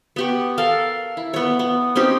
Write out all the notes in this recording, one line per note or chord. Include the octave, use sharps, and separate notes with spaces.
B3 G4 C#6
A4 A#4 F5
E4
B3 C#5
B3
C4 C#4 D#4 G4